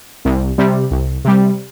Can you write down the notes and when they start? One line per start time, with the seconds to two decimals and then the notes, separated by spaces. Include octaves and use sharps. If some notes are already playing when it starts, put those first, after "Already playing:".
0.25 C2
0.58 C3 G3
0.91 C2
1.25 C3 G3